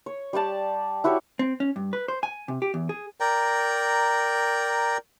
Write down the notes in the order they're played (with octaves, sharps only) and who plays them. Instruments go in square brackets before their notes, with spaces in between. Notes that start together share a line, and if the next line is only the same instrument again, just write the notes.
[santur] C#5
G3 G4 D5 A5
E4 F#4 G4 C#5
[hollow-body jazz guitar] C4
C#4
G2
B4
C5
G#5
C3
G4
E2
G#4
[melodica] A#4 D5 G5 A#5